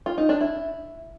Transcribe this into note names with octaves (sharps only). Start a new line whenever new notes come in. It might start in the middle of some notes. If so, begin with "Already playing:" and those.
F4
D#4
D4
E4